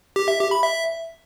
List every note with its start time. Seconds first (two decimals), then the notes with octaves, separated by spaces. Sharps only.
0.16 G4
0.28 E5
0.40 G4
0.51 B5
0.63 E5